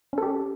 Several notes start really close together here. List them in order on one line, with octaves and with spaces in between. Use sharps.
C#4 A4 G4